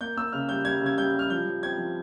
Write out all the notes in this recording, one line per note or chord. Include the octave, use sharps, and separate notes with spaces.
A#3 G6
A#3 E6
C#3 F6
G3 G6
G3 G#6
C#3
G#6
G3 G6
G3 F6
F3 G6
F3
C4 G#6
F3